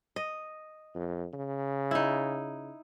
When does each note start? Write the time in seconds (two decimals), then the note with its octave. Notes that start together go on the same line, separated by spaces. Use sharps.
0.16 D#5
0.95 F2
1.33 C#3
1.91 D#4 E4